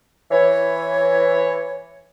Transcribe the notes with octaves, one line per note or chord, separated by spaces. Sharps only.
E3 C#5